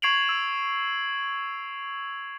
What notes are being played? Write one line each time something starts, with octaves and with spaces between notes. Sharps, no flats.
C#6 G#6 C7 D7 F7 F#7
E6